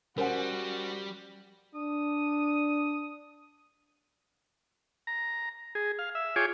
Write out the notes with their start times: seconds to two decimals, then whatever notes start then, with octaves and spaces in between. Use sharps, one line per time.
0.18 G3 C#4 F#4 A#4 C5 F#5
1.75 D4 D#6
5.07 A#5
5.75 G#4
5.99 F5
6.15 E5
6.36 F4 G#4 C#5 G5 G#5 D6